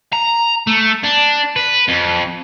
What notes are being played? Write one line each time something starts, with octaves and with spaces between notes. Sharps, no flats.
A#5
A3
D4
B4
F2